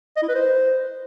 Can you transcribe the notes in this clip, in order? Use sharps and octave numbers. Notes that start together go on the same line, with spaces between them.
D#5
E4
B4
C5